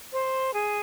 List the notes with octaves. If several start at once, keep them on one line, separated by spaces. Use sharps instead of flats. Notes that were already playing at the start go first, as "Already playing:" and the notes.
C5
G#4